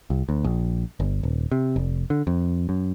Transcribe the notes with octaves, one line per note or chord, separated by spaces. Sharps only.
C2
D2
A#1
G1
D#1
C3
F1
D3
F2
F#2